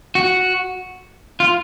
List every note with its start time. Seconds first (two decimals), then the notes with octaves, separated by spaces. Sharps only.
0.15 F#4
1.40 F4